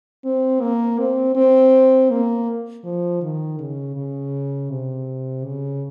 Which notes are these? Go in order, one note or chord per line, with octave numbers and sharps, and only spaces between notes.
C4
A#3
C4
C4
A#3
F3
D#3
C#3
C#3
C3
C#3